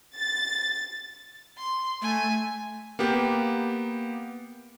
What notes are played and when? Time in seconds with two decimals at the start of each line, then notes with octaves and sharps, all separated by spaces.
0.15 A6
1.58 C6
2.02 A3 G#5
2.99 A#3 B3 G4